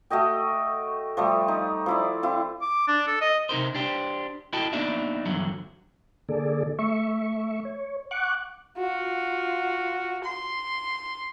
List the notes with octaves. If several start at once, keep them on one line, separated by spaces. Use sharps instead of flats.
A3 F#4 D#5 G5
F3 G3 A3
D#4
F3 E4 D5
C4 E4 F4
D6
D4
A4
D#5
C3 D#4 A#4 C5
D4 G4 C5
E4 F#4 A4 D#5 G5 A5
A#3 B3 D4 D#4 D5 E5
E2 G2 D3 F#3
D3 A#3 G#4 A4 D5
A3 E5 C#6
C#5
F#5 C#6 D6 F#6
F4 F#4
C6